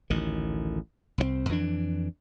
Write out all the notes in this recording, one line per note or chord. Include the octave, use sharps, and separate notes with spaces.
A1 D2 D#3
C2 F3 C4
F2 E3 C#4 D4